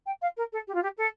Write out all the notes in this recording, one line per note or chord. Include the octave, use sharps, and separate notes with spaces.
G5
F5
A#4
A4
G4
F4
G4
A4